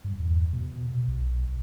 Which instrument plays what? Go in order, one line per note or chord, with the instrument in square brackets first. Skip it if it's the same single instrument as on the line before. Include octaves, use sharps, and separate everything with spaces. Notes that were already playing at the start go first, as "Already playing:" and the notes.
[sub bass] G2
E2
B2
B1